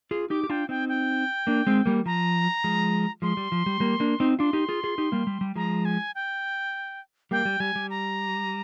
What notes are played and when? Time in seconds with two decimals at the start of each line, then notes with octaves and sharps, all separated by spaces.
0.11 F4 G#4
0.30 D#4 G4 D6
0.44 G4
0.49 D4 F4 G5
0.69 C4 D#4 G5
0.89 G5
1.47 A#3 D4
1.67 G#3 C4
1.86 G3 A#3
2.06 F3 A#5
2.64 F3 G#3
3.22 F3 G#3 C6
3.37 G3
3.52 F3
3.66 G3
3.80 G3 A#3
4.00 A#3 D4
4.20 C4 D#4
4.39 D4 F4 C6
4.53 D#4 G4
4.69 F4 G#4
4.84 F4 G#4
4.98 D#4 G4
5.12 G3 A#3
5.27 G3
5.41 G3
5.56 F3 G#3 A#5
5.85 G#5
6.15 G5
7.31 G3 A#3 G5
7.45 G3
7.60 G3 G#5
7.76 G3
7.90 A#5